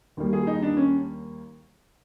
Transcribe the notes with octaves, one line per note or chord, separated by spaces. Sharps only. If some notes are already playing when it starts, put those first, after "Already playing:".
D#2 D#3 G3 A#3
G#4
D#4
D4
C#4